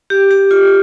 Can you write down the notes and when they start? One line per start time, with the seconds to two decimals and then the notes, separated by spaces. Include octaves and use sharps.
0.10 G4
0.31 G4
0.51 F4